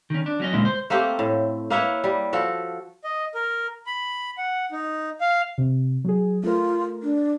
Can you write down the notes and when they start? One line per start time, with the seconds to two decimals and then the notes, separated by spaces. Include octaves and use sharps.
0.10 D#3 C#4
0.26 D4
0.40 F#3 C#4 D#5
0.53 D2 A#2 G#3 A#3 E4 D#5
0.65 C5
0.90 A3 A#3 C4 G4
1.19 A2
1.70 A#3 E4 B4 C#5
2.04 G3
2.33 F3 F#4 A4
3.04 D#5
3.35 A#4
3.86 B5
4.38 F#5
4.72 D#4
5.21 F5
5.58 C3
6.04 F#3 G#4
6.43 A3 F4 A#4
7.02 D4